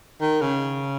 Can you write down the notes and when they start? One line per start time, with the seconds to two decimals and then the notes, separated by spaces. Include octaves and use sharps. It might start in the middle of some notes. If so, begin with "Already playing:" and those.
0.21 D#3
0.41 C#3